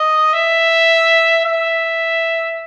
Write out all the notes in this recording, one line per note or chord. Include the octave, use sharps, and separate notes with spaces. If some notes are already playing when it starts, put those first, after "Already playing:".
Already playing: D#5
E5
E5